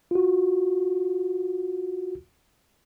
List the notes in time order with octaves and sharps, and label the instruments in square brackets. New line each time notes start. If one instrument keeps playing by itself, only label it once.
[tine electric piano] F4 F#4